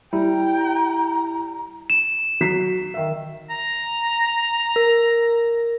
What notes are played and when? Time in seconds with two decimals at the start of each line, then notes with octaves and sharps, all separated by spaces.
0.13 G3 E4 G5 A#5
1.90 E7
2.41 F#3 B6 C7
2.94 D#3 E5
3.50 A#5
4.76 A#4